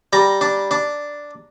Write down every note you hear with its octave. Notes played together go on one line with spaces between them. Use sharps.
G3 A#5
D4
D4